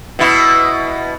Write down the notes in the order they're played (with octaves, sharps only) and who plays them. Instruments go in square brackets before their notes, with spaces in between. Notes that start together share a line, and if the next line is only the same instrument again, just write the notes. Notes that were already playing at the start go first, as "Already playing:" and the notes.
[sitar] B2 E4